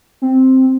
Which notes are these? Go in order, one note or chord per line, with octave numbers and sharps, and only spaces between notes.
C4